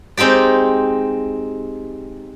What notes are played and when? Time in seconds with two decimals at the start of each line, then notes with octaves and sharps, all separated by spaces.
0.17 G#3 C4 D#4 G4 D5